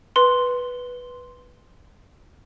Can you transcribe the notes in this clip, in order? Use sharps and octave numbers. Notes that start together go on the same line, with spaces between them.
B4 C6